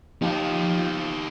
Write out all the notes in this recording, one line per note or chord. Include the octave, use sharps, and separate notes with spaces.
F3 D#4 G4